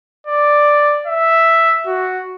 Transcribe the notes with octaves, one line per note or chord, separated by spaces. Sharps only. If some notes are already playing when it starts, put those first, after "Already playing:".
D5
E5
F#4